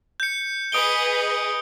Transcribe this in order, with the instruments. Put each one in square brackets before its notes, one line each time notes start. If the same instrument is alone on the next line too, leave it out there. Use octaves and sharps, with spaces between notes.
[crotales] G6 C#7
[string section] G#4 B4 D#5 [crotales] D#6 D7 G7